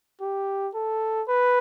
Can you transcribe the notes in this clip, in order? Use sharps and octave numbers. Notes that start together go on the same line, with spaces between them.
G4
A4
B4